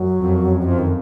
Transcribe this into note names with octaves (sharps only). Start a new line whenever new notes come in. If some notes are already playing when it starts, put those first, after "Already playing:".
Already playing: F#2 F#3
F2
F#3
F2 F3
D#3